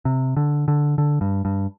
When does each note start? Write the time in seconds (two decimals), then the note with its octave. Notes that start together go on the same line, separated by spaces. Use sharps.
0.05 C3
0.37 D3
0.68 D3
0.98 D3
1.21 G2
1.45 G2